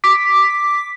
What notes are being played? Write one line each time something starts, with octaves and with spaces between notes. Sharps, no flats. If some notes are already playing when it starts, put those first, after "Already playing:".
D6 B6